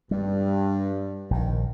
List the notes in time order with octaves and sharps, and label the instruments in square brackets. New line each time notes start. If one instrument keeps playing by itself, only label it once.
[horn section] G2 [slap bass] G3
[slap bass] A#1 [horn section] D#3